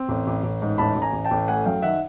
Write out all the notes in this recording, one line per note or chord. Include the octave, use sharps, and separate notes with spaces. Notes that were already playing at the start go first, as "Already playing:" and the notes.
Already playing: C4
A1
A1
A1
G#2
A1 A5 B5
A1
G#5 A#5
A1
G5 A5
A1
A3 F#5 G#5
F#2 F5 G5
D#3 E5 F#5